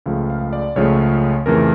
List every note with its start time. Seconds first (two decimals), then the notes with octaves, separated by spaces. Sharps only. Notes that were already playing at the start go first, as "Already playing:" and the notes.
0.06 C#2 C#3 F3 A3 F5
0.30 F5
0.53 D5
0.76 C#2 C#3 F3 A3 C#5
1.46 F2 C#3 E3 A3 A#4